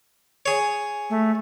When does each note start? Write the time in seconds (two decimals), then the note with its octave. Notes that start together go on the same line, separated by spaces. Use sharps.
0.46 G#4 C#5
1.10 A3